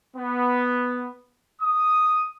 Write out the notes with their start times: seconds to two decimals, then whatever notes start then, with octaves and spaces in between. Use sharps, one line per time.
0.17 B3
1.62 D#6